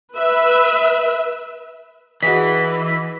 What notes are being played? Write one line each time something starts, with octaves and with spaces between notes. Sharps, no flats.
B4 E5
E3 F#4 G#4 B4 D#5 B6